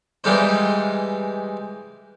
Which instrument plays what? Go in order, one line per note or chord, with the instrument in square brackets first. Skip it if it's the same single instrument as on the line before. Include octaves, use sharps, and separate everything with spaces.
[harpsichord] E3 G3 G#3 D#4 C5